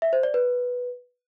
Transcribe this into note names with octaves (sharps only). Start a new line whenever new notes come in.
E5
C5
D5
B4